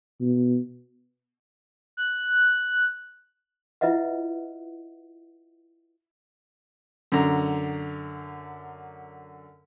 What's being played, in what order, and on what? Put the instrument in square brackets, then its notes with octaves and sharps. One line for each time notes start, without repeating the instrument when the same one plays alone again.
[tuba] B2
[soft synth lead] F#6
[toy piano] E4 F4 B4 D#5 E5 F#5
[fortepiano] F#2 D3 A#5